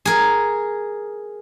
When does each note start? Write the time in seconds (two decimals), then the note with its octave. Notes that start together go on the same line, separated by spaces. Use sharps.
0.05 G#4 A#4